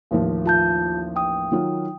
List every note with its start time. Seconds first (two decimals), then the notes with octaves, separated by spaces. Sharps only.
0.11 A1 D#2 F3
0.46 F4 A5 G6
1.16 G5 D#6
1.52 D#3 F#3 F4